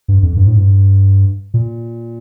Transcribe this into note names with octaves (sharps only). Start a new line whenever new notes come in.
G2
F2
G2
A2
G2
A#2